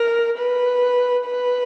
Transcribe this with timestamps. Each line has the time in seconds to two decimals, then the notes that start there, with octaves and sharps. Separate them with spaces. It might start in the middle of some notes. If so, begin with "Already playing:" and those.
Already playing: A#4
0.38 B4
1.25 B4